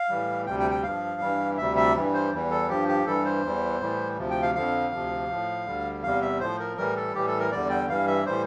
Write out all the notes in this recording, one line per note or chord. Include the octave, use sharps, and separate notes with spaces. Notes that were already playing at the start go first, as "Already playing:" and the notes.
Already playing: F5
A2 E3 G3
D2 C3 G3 G5
G5
G5
G2 F3 F5
G2 E3 G3
D2 C3 G3 E5
E5
G2 E3 G3
C5
E2 E3 G3
A4
G2 F3 G4
G4
G2 E3 G3 A4
C5
E2 E3 G3
A2 E3 G3
D2 C3 F3
G5
F5
F2 D3 F3 F5
D2 C3 F3
A2 F3
D2 D3 G3
E2 C3 G3 F5
E5
A2 F3 C5
A#4
A2 E3 G3 A#4
A4
A2 E3 G3 G4
A4
A#4
E2 D3 G3 D5
G5
G2 E3 G3 F5
E5
A2 E3 G3 C5